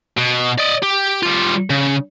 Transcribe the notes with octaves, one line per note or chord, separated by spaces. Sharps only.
B2
D5 D#5
G4
G3 F4
C#3